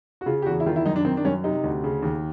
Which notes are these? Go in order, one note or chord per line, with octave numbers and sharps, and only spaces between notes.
F#4
C#3 F4
G4
E2 F#4
E4
D#3 F4
E4
F#2 D#4
D4
D#3 C4
D4
F#2 C#4
C3 D#4
D2
C#3
D#2